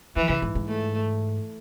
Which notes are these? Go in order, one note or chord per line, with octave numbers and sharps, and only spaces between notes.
E3 F3
C#3
G#2
G#2
A3